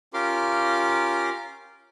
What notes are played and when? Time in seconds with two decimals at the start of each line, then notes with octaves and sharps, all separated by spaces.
0.14 C#4 F4 G4 A#4 C6 D6